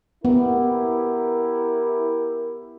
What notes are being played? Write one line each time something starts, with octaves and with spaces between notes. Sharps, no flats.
B3 E4 G4 A#4